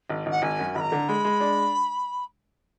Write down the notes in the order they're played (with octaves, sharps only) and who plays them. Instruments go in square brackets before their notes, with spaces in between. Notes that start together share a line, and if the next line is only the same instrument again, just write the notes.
[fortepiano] G#1
[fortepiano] G#1 [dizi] F#5
[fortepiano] G#1 [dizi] G#5
[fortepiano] F#2
[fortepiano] G#1 [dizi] B5
[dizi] A#5
[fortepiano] D3
[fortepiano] G#3 [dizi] B5
[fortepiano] G#3
D4